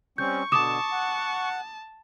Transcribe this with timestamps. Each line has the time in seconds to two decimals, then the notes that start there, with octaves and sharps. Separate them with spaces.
0.18 G3 C4 C#4 C#6 G6
0.52 B2 D3 A5 D6 D#6 E7
0.92 F#5